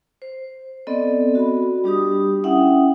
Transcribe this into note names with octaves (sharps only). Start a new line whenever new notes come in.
C5
B3 C4 A4 D5 D#5
F#4 B5
G3 D4 G4 D#6
C#4 E4 E5 F#5 G5 D#6